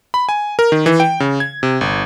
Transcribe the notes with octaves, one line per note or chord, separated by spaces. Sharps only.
B5
G#5
A#4
D#3
E3
G5
C#3
G#6
C3
G1